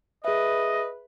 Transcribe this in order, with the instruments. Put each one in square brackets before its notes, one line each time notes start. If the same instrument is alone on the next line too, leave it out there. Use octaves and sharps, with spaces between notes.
[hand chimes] G#4 E5 [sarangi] B4 [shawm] D#5